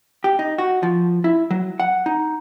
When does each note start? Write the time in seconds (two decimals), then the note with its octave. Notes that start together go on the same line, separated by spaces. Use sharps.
0.24 G4
0.39 D#4
0.58 F#4
0.83 F3
1.24 E4
1.51 F#3
1.80 F#5
2.06 D#4